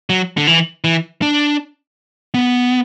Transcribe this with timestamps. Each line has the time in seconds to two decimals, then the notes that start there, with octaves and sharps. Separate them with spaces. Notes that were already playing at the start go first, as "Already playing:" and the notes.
0.10 F#3
0.37 D3
0.47 E3
0.84 E3
1.22 D4
2.34 B3